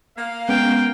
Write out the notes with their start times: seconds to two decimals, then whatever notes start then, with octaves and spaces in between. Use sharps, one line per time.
0.18 A#3 F5
0.49 G#3 B3 C#4 G5